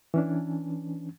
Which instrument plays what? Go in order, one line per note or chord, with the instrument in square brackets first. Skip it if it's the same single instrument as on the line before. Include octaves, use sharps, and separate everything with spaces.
[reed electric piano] E3 C#4 D4